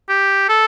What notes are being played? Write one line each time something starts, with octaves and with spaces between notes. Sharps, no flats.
G4
A4